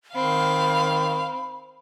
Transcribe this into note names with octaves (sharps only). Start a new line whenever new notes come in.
D#3 C4 F5 B5